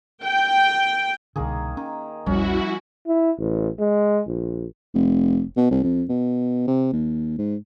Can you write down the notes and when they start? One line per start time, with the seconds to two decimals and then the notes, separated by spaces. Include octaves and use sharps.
0.24 G5
1.36 C2 B2 D3 D#3 A#3 G#4
1.77 D#3 C#4
2.26 A#1 E2 F3 G3 C#4 E4 F#4
3.07 E4
3.39 A1
3.79 G#3
4.27 A#1
4.94 F1
5.57 B2
5.71 C2
5.83 F2
6.09 B2
6.67 C3
6.93 D#2
7.38 G#2